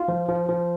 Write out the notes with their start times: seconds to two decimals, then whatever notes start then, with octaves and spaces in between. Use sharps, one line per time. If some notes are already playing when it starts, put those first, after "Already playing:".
Already playing: F4
0.08 F3
0.29 F3
0.48 F3